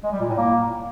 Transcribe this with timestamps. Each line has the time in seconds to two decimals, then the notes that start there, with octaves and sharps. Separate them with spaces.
0.03 G#3
0.12 G3
0.21 A#2
0.29 A2
0.38 A#3